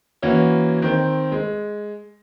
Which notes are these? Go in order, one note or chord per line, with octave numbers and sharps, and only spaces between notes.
E3 A#3 C#4 F#4
D#3 C4
G#3